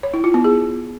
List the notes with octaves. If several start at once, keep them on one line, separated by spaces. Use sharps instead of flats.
C#5
E4
F4
B3
G#4